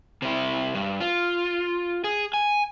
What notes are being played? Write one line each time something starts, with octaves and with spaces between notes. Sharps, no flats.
C3 E4
G2
F4
G#4
G#5